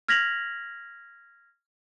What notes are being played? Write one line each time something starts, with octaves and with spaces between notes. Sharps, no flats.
F6 G#6 A#6 B6 F7 F#7